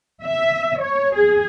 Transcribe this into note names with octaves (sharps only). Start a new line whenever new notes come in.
E5
C#5
G#4